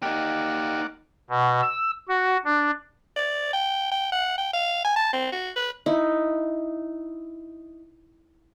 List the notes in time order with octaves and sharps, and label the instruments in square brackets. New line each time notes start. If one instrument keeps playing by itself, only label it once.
[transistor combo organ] A#3 D5 F#5 [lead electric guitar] D#4 G4
[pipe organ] B2
E6
F#4
D4
[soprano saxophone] D5
G5
G5
F#5
G5
F5
G#5
A5
C4
F#4
B4
[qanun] D#4 E4